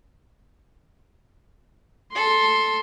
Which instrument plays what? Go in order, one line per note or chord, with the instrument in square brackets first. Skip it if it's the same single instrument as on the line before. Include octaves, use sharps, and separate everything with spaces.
[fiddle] A4 [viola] C6